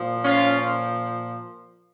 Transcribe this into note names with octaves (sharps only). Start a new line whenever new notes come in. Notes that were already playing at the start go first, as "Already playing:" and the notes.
Already playing: A#2 F3
C#4 F4